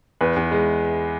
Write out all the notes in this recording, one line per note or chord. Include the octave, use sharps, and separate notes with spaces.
E2 B4
E2
G#3